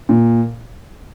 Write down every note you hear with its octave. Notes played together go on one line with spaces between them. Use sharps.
A#2